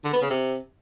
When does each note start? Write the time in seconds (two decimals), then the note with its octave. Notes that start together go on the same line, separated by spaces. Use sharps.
0.05 D3
0.13 B3
0.22 C#3
0.30 C3